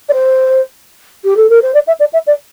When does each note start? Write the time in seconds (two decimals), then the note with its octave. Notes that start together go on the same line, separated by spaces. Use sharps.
0.09 D5
0.13 C5
1.24 G4
1.36 A4
1.49 A#4
1.62 C5
1.74 D5
1.87 E5
1.99 D5
2.13 E5
2.26 D5